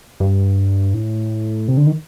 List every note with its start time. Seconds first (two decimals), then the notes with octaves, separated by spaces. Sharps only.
0.20 G2
0.94 A2
1.68 C3
1.77 D3
1.87 D#3